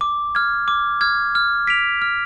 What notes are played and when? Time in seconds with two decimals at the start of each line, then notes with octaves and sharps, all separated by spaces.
0.01 D6
0.35 F6 G#6
0.68 D6
1.01 F6 G#6
1.35 F6
1.67 B6 D7 F7
2.02 F6